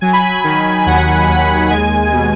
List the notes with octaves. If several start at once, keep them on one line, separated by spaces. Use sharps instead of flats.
F#3 G#5
B5
G#5
D#3
G#5
D#2 F#5
D#2 B5
G#3 G#5
B2